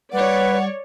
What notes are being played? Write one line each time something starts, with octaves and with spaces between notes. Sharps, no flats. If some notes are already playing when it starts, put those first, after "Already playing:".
G3 B4 C#5 D5 F#5